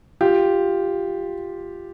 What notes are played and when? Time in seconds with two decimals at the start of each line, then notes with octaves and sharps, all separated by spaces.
0.21 F4 G4